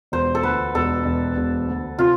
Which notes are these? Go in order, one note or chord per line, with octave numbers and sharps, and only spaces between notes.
E1 C5
A4
D2 B4
E1 A4
E1
E1
D2
C3 F4